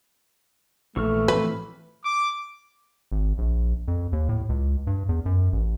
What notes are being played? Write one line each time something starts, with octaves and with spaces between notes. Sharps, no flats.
A#1 E3 A3 C#6 F6
A2 F3 C4 B4
D6
G#1
A#1
F2
D#2
A2
C#2
G2
E2
F#2
A1